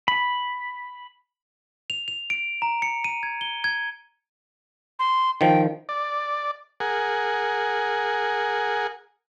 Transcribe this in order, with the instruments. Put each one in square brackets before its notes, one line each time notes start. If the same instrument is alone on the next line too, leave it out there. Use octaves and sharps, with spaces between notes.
[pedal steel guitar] B5
[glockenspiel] F7
F7
D7
A#5
C#7
D#7
G#6
G7
G#6
[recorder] C6
[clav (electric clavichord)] D#3 F3 [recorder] G5
[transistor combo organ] D5
G#4 A#4 F#5 G#5